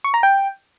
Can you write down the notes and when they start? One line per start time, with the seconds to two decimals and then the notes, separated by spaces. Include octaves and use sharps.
0.04 C#6
0.14 A#5
0.23 G5